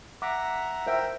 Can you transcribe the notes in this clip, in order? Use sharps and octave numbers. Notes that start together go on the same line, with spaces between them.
E5 F#5 A#5 D6
A#4 C5 E5 G5